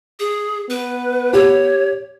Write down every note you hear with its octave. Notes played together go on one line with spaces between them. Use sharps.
G#4
B3 B4
G4 C#5